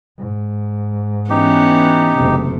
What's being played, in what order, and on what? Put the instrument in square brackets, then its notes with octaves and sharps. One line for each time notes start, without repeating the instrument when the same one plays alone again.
[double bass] G#2
[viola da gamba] E3 B3 C#4 [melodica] D#4 G4
[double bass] F#1 A3 [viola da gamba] C3